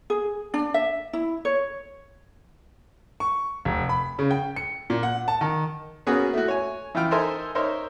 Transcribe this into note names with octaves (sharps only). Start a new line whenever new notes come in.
G#4
D4
E5
E4
C#5
C#6
F1
B5
C#3
G5
C#7
A#2
F#5
A5
D#3
A#3 B3 C#4 F#4 G#4 B4
A3 E4 F#4
C#5 G#5
E3 E4 F4 G5 F6
D#4 A4 A#4 C5 E5 G#5
D#4 A#4 C5 C#5 E5